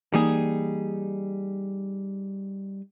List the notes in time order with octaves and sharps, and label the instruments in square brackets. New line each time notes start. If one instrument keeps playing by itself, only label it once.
[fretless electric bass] E3 A#3 [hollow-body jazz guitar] G3 D#4 G#4